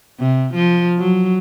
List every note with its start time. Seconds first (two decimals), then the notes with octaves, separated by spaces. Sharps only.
0.20 C3
0.54 F3
0.99 F#3